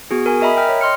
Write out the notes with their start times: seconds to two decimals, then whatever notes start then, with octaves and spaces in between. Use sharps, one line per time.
0.11 B3 F#4 G#4
0.26 A#4 G#5
0.41 A#4 D#5 E5 A#5 B5
0.57 G5 F6
0.69 C#5
0.81 D#5 C6 F6 C#7